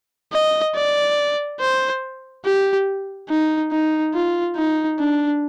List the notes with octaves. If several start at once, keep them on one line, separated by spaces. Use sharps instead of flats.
D#5
D5
C5
G4
D#4
D#4
F4
D#4
D4